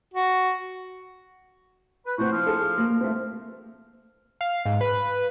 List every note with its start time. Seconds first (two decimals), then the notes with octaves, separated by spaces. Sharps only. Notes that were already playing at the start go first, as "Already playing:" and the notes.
0.14 F#4
2.06 B4
2.18 A2 C4 F#4 C5
2.32 F3 F6
2.46 G#4 A4
2.78 A#3
3.01 A3 C4
4.41 F5
4.66 G#2
4.81 B4